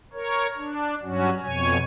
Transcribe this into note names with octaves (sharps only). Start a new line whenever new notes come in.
A#4 C#5
D4
G2 F#3 C#4 F#4
F2 B2 C#5 G#5